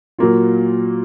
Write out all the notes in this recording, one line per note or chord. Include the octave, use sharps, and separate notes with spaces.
A#2 F#3 A#3 F4